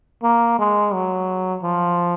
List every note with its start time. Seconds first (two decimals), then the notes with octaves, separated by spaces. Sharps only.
0.23 A#3
0.59 G#3
0.94 F#3
1.62 F3